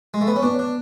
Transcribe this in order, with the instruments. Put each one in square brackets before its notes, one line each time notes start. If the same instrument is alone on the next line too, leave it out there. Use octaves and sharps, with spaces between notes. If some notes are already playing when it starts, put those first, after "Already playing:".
[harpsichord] G#3
A3
B3
C#4
[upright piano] B3 [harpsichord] D4
[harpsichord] D4